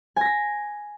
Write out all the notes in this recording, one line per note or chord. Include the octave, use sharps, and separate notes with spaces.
G#5 A#6 B6